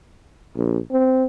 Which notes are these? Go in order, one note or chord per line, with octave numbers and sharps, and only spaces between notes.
A#1
C4